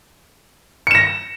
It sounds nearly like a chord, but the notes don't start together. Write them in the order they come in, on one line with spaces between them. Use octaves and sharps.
C#7 E7 A#6